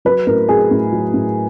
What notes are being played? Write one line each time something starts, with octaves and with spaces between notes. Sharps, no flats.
F#3 B4
A2 A#4
F#3 G#4
A2
F#3
A2